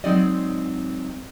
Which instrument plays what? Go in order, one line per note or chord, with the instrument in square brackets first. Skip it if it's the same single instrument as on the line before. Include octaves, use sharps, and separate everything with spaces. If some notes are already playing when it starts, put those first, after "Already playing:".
[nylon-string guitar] F#3 G#3 C4 D#4 D5 D#5